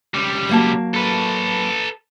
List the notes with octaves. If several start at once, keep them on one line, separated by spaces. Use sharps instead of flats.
C#2 G3
F#3 A#3 A5
A4 B4